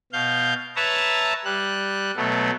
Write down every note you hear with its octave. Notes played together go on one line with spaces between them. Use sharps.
B2 F5 G6
B4 C#5 E5 A5 A#5
G3 F#6
B2 F#3 A3 B3